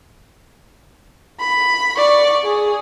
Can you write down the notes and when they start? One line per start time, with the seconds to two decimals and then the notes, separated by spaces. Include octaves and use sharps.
1.40 B5
1.97 D5 C#6
2.45 G#4